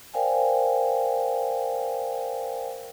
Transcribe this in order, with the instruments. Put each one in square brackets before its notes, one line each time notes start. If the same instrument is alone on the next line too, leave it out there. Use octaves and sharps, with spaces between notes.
[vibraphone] A#4 C5 D5 F5 G5 G#5